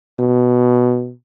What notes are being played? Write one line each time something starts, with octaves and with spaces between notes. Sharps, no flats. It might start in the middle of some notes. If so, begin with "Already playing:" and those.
B2